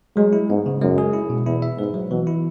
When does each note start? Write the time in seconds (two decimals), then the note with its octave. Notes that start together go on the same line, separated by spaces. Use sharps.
0.17 F#3 G#3
0.33 E4
0.50 G#2 B3
0.66 C#3
0.81 F#2 G#3
0.98 G#4
1.13 E4
1.30 B2
1.46 E2 E4
1.62 E5
1.79 G#2 B4
1.94 F#3
2.11 B2 E3
2.27 E4